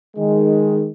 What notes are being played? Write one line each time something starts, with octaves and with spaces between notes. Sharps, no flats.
D#3 G#3